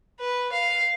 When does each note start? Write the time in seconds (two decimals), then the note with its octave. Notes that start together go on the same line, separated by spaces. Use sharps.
0.20 B4
0.52 F5